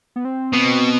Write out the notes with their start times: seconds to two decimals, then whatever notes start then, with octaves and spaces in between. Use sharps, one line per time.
0.16 B3
0.25 C4
0.53 B2